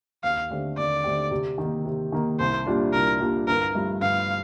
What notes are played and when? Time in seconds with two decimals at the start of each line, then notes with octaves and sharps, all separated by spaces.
0.24 D#2 F5
0.50 D3 A3 C4 G4
0.77 D#2 D5
1.04 D3 A3 C4 G4
1.31 C3
1.58 D#3 A#3
1.85 C3
2.12 D#3 A#3
2.40 C2 C5
2.66 A#2 G3 D4 F4
2.94 C2 A#4
3.20 A#2 G3 D4 F4
3.47 G1 A#4
3.75 G2 F3 A3
4.01 G1 F5